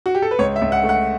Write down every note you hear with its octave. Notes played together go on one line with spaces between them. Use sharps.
F#4
G4
A4
B4
C#2 C#5
E5
C#2
F#5
A3
F#5